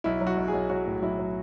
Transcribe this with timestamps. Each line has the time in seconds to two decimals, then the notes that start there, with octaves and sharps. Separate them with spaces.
0.04 B1 E4
0.21 F#3
0.27 F#4
0.37 B1
0.48 G#4
0.53 B1
0.70 F#3 F#4
0.87 A2
1.02 B1 E4
1.19 F#3